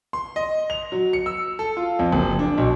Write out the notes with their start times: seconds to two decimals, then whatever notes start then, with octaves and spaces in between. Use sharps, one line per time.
0.13 C6
0.36 D#5
0.70 F7
0.92 F#3
1.13 C#7
1.26 E6
1.59 A4
1.77 F4
1.99 F2
2.13 F#1
2.39 D4
2.58 B1